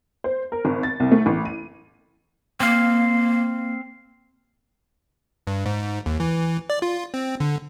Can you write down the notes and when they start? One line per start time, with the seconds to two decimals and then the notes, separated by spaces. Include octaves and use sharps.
0.24 C5
0.52 A#4
0.65 G#1
0.83 A6
1.00 C2
1.12 A3
1.26 A1
1.45 D#7
2.60 A#3 C4 F5
5.47 G2
5.66 G#2
6.06 D#2
6.20 E3
6.70 D5
6.82 F4
7.14 C4
7.40 D3